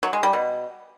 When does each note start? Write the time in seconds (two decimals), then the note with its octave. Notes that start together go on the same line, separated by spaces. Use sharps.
0.03 F#3
0.13 G#3
0.23 G3
0.33 B2